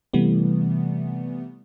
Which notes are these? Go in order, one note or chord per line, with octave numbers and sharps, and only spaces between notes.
C3 E3 G3 A3 B3